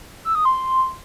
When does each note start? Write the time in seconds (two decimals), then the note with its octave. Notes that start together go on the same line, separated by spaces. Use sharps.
0.25 E6
0.35 D#6
0.45 C6